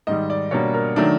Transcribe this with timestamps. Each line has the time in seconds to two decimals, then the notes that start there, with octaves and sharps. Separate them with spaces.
0.07 G#2 D#3 G3 D#5
0.30 D5
0.51 B2 G3 A#3 D4 C#5
0.74 A#4
0.96 D#3 F#3 A3 D4